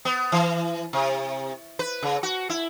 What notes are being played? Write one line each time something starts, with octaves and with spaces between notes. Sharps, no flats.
B3
E3
C3
B4
C#3
F#4
E4